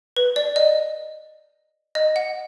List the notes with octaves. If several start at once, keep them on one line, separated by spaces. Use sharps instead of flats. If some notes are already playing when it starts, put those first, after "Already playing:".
B4
D5
D#5
D#5
F#5